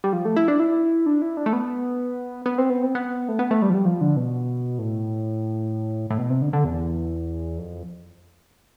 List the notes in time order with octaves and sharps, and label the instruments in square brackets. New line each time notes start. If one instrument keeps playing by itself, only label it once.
[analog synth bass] G3
F3
A3
E4
D4
E4
D4
E4
D4
A3
B3
B3
C4
B3
C4
B3
A3
B3
A3
G3
F3
G3
F3
D3
B2
A2
A2
B2
C3
D3
D3
E2
F2